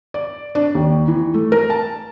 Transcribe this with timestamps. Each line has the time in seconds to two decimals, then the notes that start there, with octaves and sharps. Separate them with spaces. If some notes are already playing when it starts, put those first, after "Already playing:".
0.14 D5
0.55 D4
0.75 D#2
1.08 E3
1.34 A3
1.52 A#4
1.70 A5